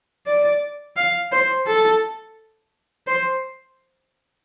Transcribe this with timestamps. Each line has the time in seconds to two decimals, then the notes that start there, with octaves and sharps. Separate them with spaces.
0.27 D5
0.97 F5
1.32 C5
1.67 A4
3.07 C5